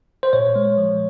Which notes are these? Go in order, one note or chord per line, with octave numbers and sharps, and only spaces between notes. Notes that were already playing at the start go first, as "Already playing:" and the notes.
C5
A#2 C#5
G#3
F3